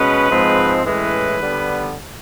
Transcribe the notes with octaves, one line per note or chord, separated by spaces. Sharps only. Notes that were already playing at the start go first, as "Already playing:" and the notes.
Already playing: B2 G#3 C#4 B4
G#2 F3 G#3 C4
A2 E3 G#3 C#4 B4
D3 G3 B3